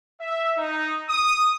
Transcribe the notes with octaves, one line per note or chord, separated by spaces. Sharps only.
E5
D#4
D#6